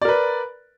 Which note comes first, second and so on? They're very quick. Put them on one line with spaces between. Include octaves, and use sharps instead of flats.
D5 A#4 B4